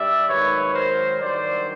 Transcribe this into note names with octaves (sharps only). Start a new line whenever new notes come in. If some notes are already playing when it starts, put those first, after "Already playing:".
Already playing: G2 D5 E5
G#2 D#3 F#3 B4 C#5
A#4 C5
G2 D#3 F#3 C5 D5